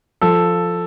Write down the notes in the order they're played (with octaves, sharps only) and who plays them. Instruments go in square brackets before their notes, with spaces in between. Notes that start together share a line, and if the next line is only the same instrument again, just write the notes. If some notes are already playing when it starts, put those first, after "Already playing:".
[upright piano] F3 [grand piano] A4